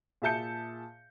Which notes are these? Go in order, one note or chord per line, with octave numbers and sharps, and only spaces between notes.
A#2 G#4 E5 A5 G6 C#7